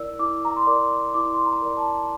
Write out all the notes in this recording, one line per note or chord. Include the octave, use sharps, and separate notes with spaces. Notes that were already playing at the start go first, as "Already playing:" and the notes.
Already playing: E4 A#4 D5 E6
E4 D6
A#5
C6
A#4 D5 D6
E4 D6
C6
A#5
A#4 D5
A5